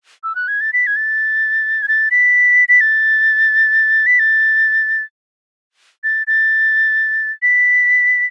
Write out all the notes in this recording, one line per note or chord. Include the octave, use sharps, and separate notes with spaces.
E6
F#6
G#6
A6
B6
G#6
A6
G#6
A6
B6
B6
A6
B6
A6
A6
A6
B6